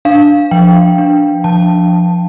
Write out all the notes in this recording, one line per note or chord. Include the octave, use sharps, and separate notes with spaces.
D4 F5
F3 G5
D4
F3 A5